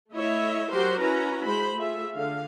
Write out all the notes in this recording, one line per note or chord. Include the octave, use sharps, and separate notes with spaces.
A3 E4 C#5 D#5 E5
F#3 F#4 G4 A#4 C5 C6
C#4 E4 F#4 B4 A#5
G#3 C5 B5
A3 F4 G#4 E5
D3 F5